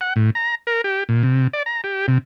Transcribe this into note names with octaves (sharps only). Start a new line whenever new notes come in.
F#5
A2
A#5
A#4
G4
A#2
C3
D5
A#5
G4
C3